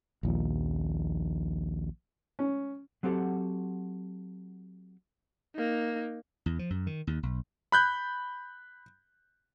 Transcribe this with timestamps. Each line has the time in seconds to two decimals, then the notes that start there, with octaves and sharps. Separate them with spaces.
0.23 A#1 D#2 F3
2.39 C#4
3.03 F#3 C4 F#4 G4 A4 F#5
5.55 A#3 D#4
6.46 E2
6.59 F3
6.70 F#2
6.87 D#3
7.07 D#2
7.23 B1
7.72 B5 F#6 G6